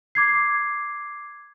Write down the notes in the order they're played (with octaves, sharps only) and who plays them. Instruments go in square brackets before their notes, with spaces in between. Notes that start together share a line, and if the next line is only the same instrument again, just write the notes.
[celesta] D6 G#6 C7